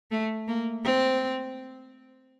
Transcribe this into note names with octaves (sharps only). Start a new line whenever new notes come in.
A3
A#3
C4